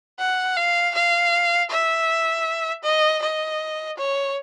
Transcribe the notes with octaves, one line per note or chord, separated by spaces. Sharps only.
F#5
F5
F5
E5
D#5
D#5
C#5